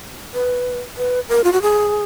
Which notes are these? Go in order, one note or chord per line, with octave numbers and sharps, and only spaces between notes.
B4
B4
A#4
F4
F#4
G#4